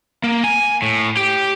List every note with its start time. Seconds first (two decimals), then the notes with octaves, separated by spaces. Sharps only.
0.24 A#3
0.44 G#5
0.82 A2
1.17 G4